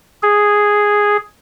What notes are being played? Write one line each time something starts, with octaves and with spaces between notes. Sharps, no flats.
G#4